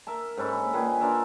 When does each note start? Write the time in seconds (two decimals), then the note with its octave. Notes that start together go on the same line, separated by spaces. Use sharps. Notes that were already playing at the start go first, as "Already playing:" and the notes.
0.07 A#4 E5 A5
0.37 G#2 C#4 A4 B5
0.53 A#3 B5
0.73 A#2 D#3 G#4 B4
1.00 D4 F4 A#4 E5